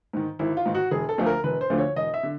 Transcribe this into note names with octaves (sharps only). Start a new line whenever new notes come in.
G#2 D#3
G#1 E4
F4
G#2 D#3
F#4
E1 G#4
A4
D2 D3 F3 A3
A#4
E1 B4
C5
D2 D3 F3 A3
C#5
E1 D#5
E5
D3